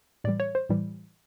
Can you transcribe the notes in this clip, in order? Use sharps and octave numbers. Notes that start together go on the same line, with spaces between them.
A2 E3 G3 D5
C#5
C5
A2 E3 G3